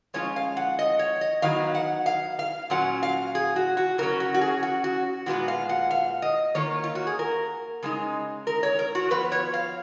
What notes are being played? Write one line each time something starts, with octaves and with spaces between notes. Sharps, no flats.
F3 G#3 C#4 F4 C#5
F5
F#5
D#5
C#5
D#5
D#3 F#3 B3 D#4 F5
F#5
F5
F5
A#2 F#3 C#4 F4 F#5
F5
G#4
F#4
F#4
C#3 F#3 C#4 A#4
F#4
F#4
G#4
F#4
F#4
A#2 G#3 B3 F4 F#4
F5
F#5
F5
D#5
D#3 A#3 F4 C#5
F4
F#4
G#4
A#4
C#3 G#3 D#4
A#4
C#5
A#4
F#4
F3 B3 F4 B4
C#5
F5